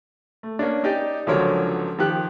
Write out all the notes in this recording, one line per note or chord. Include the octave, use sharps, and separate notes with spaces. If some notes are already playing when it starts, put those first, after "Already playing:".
A3
A#3 C#4 D4
D#4 G4 D5 D#5
C#2 D3 F3 F#3 A#4 C#5
D#3 F3 G4 F#6